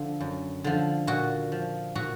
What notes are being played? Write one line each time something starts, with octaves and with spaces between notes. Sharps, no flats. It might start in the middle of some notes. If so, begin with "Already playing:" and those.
Already playing: D3 F3
F#2
D3 F3
A#2 F#4
F3
A#2 F#4